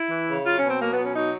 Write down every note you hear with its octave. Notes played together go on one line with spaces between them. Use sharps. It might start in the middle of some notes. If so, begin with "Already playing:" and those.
Already playing: E4
E3
C#3
F#3 F4
C#4
B2
C4
F#3 A#3
B3
B2
C#4
F#3 D#4